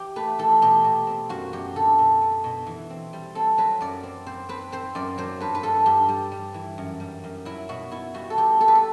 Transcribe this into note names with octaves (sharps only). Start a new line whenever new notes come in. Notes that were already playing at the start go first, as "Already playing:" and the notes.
Already playing: E3 G4
A3 B4
E3 A4
B2 G4
B2
C4
F#2 F#4
F#2 G4
D3 A4
B2
B3
B2
E3
C4
G3
C4 A4
F#3 B4
F#2 D5
C4
C4 C5
C4 B4
C4 C5
F#2 D5
F#3 C5
G2 B4
B4
G2 A4
G2 G4
G3
G3
E3
F#2
G3
F#2
F#3 E4
B2 F#4
B3 E4
G3 F#4
A4
B3 G4
B3 A4
B4
A4